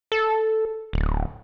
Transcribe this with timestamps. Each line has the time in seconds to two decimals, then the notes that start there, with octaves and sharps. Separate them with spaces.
0.12 A4
0.93 D1